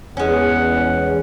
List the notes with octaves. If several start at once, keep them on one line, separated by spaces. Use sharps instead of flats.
E2 G#3 C#4 F#5